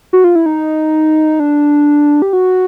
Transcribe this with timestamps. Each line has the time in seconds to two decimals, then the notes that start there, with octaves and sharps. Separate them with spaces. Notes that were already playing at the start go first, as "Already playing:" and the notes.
0.13 F#4
0.24 F4
0.35 E4
0.46 D#4
1.40 D4
2.22 G4
2.33 F#4